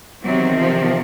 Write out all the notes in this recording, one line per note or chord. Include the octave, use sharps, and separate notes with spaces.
E2 C3 D#3 F#3
F3